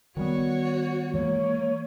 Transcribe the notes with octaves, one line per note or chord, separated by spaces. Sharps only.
D#3 G3 B3 F#4 C#5
E3 G#3 A#3 C#5